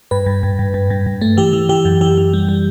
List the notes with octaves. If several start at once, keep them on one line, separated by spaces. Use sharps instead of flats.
G2 B4
G2
G2
G2
G2
G2
G2
A3
E3 G4
E3
E3 G4
F#2
E3 G4
E3
G3
G3